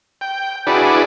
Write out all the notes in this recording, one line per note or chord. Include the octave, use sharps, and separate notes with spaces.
G5
D4 E4 F#4 G#4 B4 D5